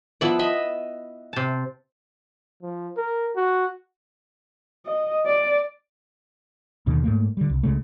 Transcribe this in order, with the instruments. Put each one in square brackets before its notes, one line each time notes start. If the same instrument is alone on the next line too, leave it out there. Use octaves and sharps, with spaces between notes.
[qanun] F3 B3 B5 [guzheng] E4 D5
[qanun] D#5 E5 B5
[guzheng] C3 A5
[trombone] F3
A#4
F#4
[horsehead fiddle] D#5
D5
[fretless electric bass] D#2 B2 D3 D#3
G#2 A3 A#3
D3 G3
C2
C#2 C#3 G#3 A3